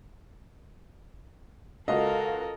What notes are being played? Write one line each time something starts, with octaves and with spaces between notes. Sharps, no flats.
C#2 F#4 A4 A#4 D#5 F5